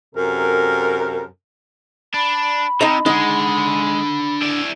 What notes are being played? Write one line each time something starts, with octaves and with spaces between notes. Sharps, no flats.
F#2 C3 A4 A#4
D4 B5
C3 D#4 D#5 A#5
G#3 D4 D#4 F#5
E4 D5